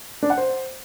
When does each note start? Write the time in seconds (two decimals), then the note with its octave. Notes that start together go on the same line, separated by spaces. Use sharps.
0.23 D4
0.30 F#5
0.38 C5